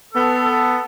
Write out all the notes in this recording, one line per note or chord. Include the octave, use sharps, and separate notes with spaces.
B3 A4